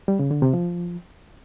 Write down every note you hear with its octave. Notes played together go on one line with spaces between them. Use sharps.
G3
C#3
D3
C3
F3